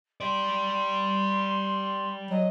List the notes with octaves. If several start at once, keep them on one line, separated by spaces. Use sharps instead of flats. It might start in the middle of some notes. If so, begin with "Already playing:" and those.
G4 D5 C6
F#3 D#5